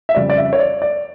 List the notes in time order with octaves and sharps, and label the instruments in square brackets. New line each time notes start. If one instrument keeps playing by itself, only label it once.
[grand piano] E5
F2 C#3 G3 D5
D5
E5
C#5
D5
D5